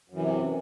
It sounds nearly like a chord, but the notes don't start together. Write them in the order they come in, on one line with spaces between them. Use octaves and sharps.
F#2 E3 C3